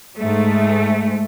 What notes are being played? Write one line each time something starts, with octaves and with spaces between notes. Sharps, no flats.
G#2 A3